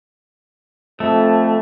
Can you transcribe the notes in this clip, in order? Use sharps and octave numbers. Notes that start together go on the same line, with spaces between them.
F2 A3